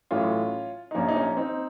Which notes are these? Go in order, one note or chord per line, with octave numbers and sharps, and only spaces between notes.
A1 A2 F#3 C#4 F4
D#4
A#1 A#2 F3 A#3 C#4
D#4
A#3 C#4
C4 D#4